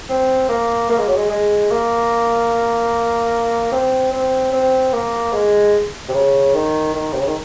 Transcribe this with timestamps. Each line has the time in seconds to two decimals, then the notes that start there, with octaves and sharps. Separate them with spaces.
0.09 C4
0.49 A#3
0.89 A#3
0.98 G#3
1.08 F#3
1.17 G#3
1.30 G#3
1.70 A#3
3.72 C4
4.12 C4
4.52 C4
4.93 A#3
5.32 G#3
6.09 C3
6.13 C#3
6.54 D#3
6.94 D#3
7.14 C3
7.20 C#3
7.27 D#3